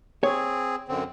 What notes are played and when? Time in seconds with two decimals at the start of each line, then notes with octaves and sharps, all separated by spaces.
0.23 C4 G#4 C#5
0.88 F#2 D3 C4